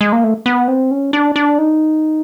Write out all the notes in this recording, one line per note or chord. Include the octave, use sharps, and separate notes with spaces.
G#3
A#3
A3
B3
C4
C#4
D4
D4
D#4